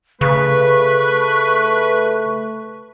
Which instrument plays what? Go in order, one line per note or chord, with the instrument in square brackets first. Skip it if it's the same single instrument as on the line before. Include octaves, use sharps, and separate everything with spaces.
[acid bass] C#3 [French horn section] A3 [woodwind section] B4 [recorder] C#6